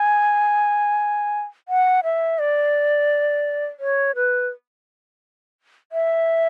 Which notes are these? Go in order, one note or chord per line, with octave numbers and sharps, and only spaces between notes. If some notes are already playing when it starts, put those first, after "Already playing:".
Already playing: G#5
F#5
E5
D5
C#5
B4
E5